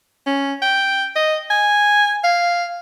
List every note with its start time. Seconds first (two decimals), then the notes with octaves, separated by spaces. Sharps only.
0.26 C#4
0.62 G5
1.16 D#5
1.50 G#5
2.24 F5